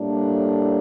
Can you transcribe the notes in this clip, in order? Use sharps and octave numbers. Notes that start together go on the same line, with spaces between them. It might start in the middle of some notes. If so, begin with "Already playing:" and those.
Already playing: A2 G3 A#3 D4